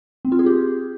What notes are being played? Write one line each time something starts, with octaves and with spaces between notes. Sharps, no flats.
C4
F4
G#4
G4